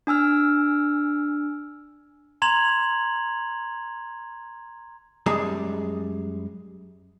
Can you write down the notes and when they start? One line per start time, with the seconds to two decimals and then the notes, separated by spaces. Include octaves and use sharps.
0.07 D4 G#5 E6 F6
2.42 A#5 C6 G#6 F7 F#7
5.26 F#2 G3 G#3 G#4 A5 A#5